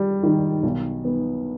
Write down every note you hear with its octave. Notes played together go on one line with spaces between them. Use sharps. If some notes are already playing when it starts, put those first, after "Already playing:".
Already playing: G3
D#3
B1
B3